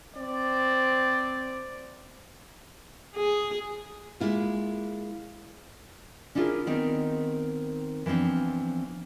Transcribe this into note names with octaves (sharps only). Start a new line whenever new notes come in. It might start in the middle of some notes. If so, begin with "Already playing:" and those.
C4 D5
G#4
G#3 A#3 E4 F4
C#4 D4 E4 F4 G#4 A#4
D#3 B3 C4 D#4
E3 F3 B3 C4 D4